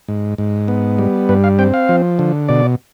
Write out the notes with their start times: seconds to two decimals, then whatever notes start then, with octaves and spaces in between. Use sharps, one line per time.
0.08 G#2
0.38 G#2
0.68 B3
0.99 G3
1.29 G2 B4
1.44 F5
1.59 C4 G5
1.74 F5
1.89 F3
2.19 D3
2.49 B2 D5